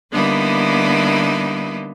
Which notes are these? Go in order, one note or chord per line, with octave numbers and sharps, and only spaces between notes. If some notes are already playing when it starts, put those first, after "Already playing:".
D3 G3 A#3 B3 D#4 E4